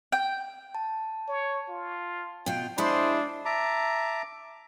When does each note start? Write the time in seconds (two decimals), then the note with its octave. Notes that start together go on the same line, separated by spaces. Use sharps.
0.12 G5
0.75 A5
1.28 C#5
1.68 F4
2.46 B2 F4 G5
2.78 G#3 D4 E4 G#4 C5 B5 D#6
3.45 E5 A5 A#5 D6